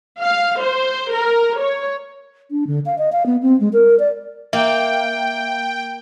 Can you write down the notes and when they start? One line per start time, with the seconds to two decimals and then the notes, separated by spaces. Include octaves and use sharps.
0.20 F5
0.61 C5
1.12 A#4
1.59 C#5
2.51 D4
2.67 D3
2.86 F5
2.98 D#5
3.12 F5
3.26 B3
3.42 C4
3.60 G#3
3.73 A#4
3.99 D5
4.53 A#3 E5 G5